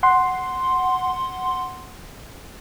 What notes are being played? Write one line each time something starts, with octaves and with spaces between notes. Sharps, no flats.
F#5 C6